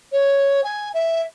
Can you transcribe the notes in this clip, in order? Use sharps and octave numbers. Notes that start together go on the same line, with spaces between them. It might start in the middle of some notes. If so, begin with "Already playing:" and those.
C#5
G#5
E5